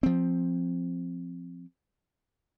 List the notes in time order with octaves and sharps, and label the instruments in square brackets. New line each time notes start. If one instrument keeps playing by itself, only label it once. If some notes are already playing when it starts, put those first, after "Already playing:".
[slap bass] F3 C4